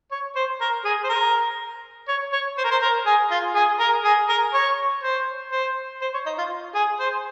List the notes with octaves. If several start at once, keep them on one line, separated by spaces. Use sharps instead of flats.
C#5
C5
A#4
G#4
C5
A#4
C#5
C#5
C5
A#4
C5
A#4
G#4
F4
G#4
A#4
G#4
A#4
C#5
C5
C5
C5
C#5
D#4
F4
G#4
C5